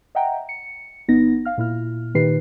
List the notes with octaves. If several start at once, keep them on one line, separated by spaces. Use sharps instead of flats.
D#5 E5 F#5 G5 A#5
C#7
G1 B3 D#4 A#6
F5 F6
A#2 E4 F6
A#2 D#3 D#4 G4 B4 C7